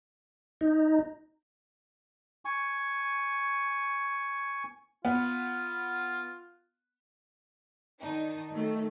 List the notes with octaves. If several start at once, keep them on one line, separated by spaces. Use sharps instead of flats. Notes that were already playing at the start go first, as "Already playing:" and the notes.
D#4
G#5 C#6
B3 F4
D#3 D4 D#4
D#3 F#3 A3